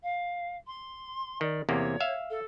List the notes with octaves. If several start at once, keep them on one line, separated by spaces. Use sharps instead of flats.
F5
C6
D#3 D5
E2 C3 A#3 C#5
E5 F5
A4